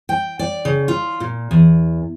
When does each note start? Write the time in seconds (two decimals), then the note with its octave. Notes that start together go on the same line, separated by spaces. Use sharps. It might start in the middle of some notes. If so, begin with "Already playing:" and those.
0.09 G5
0.39 D5
0.65 C#3
0.88 F4
1.20 A#2
1.51 E2